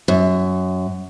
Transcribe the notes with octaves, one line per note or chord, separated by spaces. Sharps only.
F#2